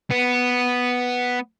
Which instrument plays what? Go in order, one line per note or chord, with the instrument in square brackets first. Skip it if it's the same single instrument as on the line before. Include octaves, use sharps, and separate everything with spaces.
[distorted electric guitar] B3